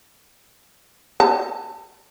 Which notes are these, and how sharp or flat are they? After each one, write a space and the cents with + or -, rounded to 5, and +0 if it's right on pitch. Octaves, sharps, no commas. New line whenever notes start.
A5 +35